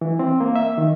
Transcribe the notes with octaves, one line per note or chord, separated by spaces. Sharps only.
E3
C4
A#3
E5
D#3